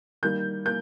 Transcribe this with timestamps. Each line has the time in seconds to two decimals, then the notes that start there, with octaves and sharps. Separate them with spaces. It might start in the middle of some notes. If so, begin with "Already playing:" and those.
0.23 D#3 G3 A#3 G6
0.65 A#3 G6